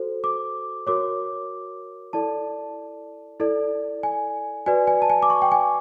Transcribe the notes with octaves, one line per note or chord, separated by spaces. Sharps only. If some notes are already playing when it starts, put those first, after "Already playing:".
Already playing: F#4 A4 C5
D6
F#4 A#4 C#5 D6
E4 A4 D5 A5
E4 A4 D5
G#5
F#4 B4 D5 G#5
G#5
A5
G#5
D6
C#6
G5
G#5